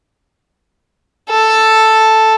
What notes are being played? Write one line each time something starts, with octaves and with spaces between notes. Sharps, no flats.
A4